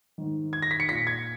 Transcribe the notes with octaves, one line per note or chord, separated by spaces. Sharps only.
G#2 D#3
G#6
A#6
B6
C#7
A#2 B6
G#6